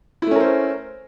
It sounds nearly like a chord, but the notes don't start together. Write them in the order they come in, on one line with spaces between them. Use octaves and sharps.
E4 A3 C#4 A#4 C5